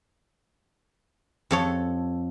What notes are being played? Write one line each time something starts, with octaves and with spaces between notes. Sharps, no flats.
F2 A4 C#5